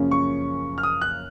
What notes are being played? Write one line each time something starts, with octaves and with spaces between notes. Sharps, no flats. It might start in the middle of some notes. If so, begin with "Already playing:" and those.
Already playing: F#2 C#3 F3 A#3 C#4
C#6
F6
D#6
F#6